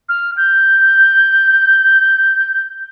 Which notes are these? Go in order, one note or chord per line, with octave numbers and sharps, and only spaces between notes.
F6
G6